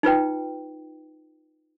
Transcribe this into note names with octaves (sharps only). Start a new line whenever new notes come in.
D#4 F4 B4 G5